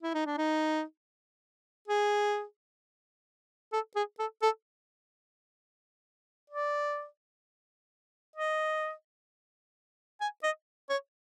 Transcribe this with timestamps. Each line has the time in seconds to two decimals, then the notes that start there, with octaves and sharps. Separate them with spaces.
0.03 E4
0.14 D#4
0.26 D4
0.37 D#4
1.88 G#4
3.73 A4
3.96 G#4
4.19 A4
4.42 A4
6.50 D5
8.36 D#5
10.21 G#5
10.43 D#5
10.89 C#5